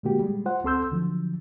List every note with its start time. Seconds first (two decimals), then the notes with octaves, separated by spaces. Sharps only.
0.03 A#2 D3 G#3 A#3 F#4 G4
0.19 G3 G#3
0.46 F4 C5 F#5
0.64 D2 C4 A4 C6 E6 G6
0.91 D3 F3 F#3